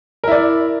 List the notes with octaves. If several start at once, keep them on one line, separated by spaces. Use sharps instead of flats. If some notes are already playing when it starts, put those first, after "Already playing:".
E4 A#4 D5